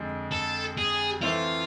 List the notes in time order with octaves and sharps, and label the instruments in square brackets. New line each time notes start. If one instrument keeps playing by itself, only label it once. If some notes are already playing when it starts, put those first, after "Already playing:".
Already playing: [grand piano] F2 D3 G#3
[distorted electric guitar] A4
G#4
[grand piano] E3 A3 C4 E4 [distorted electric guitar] F4